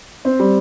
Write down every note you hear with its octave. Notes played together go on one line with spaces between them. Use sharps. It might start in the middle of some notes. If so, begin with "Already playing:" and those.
C4
G3